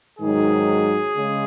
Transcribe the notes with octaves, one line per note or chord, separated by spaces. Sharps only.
G#2 D#3 F#3 G#4
C#3 G#3